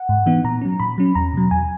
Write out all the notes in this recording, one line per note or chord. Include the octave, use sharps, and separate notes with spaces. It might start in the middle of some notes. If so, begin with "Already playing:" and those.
Already playing: F#5
G#2
E3 B3 D#4
A#2 A#5
F#3 C#4
A#2 B5
F#3 C#4
E2 A#5
B2 F#3
E2 G#5